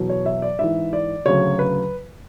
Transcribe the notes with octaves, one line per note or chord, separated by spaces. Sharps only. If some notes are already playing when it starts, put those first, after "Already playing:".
Already playing: E2 B2 F#3
C#5
E5
D5
G#2 E3 E5
D5
D2 C#3 F#3 C#5
B4